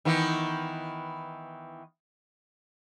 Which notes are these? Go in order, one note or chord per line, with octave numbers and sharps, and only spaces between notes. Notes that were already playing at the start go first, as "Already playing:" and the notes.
D#3 E3 B3